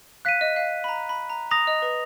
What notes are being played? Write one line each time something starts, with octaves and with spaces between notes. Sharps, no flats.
F5 F#6 B6 D#7
D#5
F5
B5
A#5
B5
A#5
A#5 D#6 A#6 F7
D#5
B4